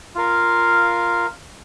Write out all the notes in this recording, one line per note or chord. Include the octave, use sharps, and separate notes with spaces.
F4 A#4 F5